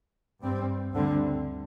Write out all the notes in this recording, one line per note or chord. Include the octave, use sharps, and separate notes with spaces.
G2 G3 C4
D2 D3 G3 C4